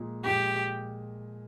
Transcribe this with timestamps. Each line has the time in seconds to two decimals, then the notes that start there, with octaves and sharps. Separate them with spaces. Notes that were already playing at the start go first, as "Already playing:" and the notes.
Already playing: A#2 F3 G#3
0.25 A#2 F3 G#3 G4